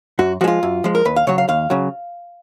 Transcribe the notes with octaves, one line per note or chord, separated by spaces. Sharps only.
F#2 F#4
F3 G#3 F4 F#4
F#2
F3 G#3
A#4
D#2 B4
F5
C#3 F#3 C#5
F5
D#2 F5
C#3 F#3